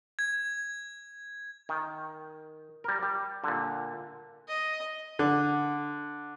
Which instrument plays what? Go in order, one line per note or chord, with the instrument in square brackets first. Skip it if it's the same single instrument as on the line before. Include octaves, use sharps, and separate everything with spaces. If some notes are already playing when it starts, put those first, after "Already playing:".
[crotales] G#6
[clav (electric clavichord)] D#3
G3 A#4
G3
A#2 D3
[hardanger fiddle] D#5
[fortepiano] D3